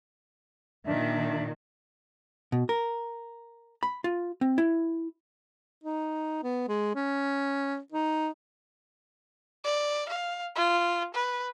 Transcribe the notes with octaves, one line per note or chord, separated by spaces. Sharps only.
A#2 D#3 D4 E5
B2
A#4
B5
F4
C4
E4
D#4
B3
G#3
C#4
D#4
D5
F5
F4
B4